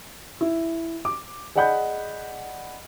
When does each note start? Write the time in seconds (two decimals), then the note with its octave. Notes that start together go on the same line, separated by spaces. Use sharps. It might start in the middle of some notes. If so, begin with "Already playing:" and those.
0.41 E4
1.05 D6
1.55 G#4 D5 D#5 F#5 B5 G6